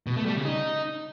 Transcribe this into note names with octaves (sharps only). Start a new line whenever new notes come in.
B2
A3
G3
C#3
D#4